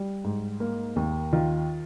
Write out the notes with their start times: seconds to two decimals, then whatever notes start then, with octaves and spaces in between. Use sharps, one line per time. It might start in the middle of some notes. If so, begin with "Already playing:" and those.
Already playing: G3
0.24 G#2
0.60 A#3
0.96 D#2
1.33 D#3 F4